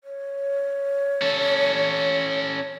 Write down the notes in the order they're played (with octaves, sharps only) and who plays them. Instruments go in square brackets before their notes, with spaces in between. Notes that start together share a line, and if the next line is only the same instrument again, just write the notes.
[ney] C#5
[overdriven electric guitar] C#4 A4